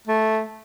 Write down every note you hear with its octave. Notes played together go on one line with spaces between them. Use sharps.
A3